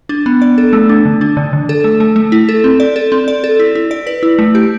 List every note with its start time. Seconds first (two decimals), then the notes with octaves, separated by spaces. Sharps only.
0.09 D4
0.26 B3
0.42 D5
0.58 A4
0.73 A3
0.89 D4
1.05 D3
1.21 D4
1.37 D3
1.53 D3
1.69 A4
1.84 A3
2.00 A3
2.16 A3
2.32 E4
2.49 A4
2.64 C4
2.80 D5
2.96 A4
3.12 C4
3.28 D5
3.44 A4
3.59 E4
3.75 E4
3.91 D5
4.07 B4
4.23 E4
4.39 A3
4.55 G4